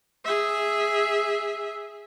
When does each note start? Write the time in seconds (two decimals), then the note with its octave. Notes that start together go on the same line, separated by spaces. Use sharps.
0.25 G#4 E5